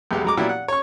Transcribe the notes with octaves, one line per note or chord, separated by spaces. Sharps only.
B1 E2 G#3 G4
F#3 G#3 A#5 D6
A#2 F#3 B3 E4 G4
F#5
C#5 C#6